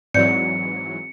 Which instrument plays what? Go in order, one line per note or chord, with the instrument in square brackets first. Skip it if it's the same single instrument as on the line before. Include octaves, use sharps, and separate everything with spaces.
[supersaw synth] G#2 E3 F#3 [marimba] C4 D5 G6 [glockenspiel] C#7